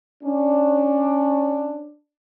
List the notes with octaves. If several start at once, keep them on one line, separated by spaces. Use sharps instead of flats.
C#4 D4